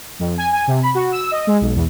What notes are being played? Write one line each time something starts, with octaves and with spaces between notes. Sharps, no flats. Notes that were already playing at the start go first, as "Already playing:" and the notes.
F2
G#5
G#5
C3
B5
F#4
E6
D#5
G#3
B1
E2